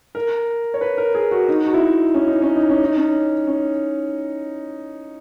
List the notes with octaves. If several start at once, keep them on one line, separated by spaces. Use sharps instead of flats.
A#4
C#5
B4
A#4
G#4
F#4
D#4
F#4
E4
D#4
C#4
D#4
C#4
D#4
C#4
D#4
C#4
C#4